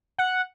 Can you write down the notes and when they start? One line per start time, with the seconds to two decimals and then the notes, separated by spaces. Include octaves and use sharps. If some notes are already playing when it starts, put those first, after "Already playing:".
0.18 F#5